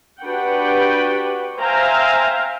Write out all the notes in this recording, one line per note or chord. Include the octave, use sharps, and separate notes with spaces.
D4 F#4 G4 B4 F#5 G5
C5 E5 F5 G5 G#5 A#5